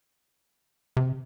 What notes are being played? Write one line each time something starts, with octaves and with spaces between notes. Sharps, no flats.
C3